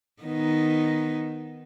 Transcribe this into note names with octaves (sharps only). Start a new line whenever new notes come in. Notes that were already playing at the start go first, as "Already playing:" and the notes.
D#3 B3 D#4